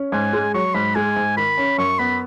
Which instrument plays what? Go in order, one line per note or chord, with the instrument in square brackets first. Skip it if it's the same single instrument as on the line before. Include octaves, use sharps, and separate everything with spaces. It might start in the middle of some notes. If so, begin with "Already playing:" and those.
Already playing: [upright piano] C#4
[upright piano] G#2 [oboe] G#5
[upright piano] G#3
[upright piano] F#3 [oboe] C#6
[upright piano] G#2 [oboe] B5
[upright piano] G#3 [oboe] G#5
[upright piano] G#2
[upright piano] D#3 [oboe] B5
[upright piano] C#4
[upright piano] F#2 [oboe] C#6
[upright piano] B3 [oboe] B5